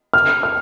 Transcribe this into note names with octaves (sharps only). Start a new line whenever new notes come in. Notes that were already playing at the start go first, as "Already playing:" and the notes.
F6
F6